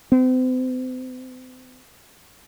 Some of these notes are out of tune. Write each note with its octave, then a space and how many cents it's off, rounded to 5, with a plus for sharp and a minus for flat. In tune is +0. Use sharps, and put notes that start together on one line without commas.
C4 -40